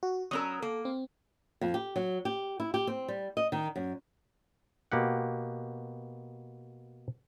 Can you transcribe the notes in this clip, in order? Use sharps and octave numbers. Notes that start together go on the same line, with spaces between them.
F#4
F#3 C#4 A#4 D#6 E6
A#3 A4
C4
F2
G4
F#3
G4
E4
G4
C4
G3
D#5
D#3
F#2
B2 A#3 G4 F#5